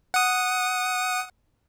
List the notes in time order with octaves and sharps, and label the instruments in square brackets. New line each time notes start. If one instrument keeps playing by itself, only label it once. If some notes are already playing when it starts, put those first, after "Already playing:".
[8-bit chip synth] F#5 D#6